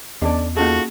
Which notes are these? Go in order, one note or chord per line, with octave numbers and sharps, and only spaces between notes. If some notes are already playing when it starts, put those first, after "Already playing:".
E2 B3 C#4 D4 A4 D5 D#5
A#3 C#4 D#4 F4 F#4 G#4 A4